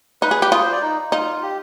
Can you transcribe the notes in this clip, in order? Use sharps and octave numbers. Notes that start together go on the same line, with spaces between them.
D#4 B4
G#4
G4
F4 G#4
C5
D5
D#4
D#4 F4
G4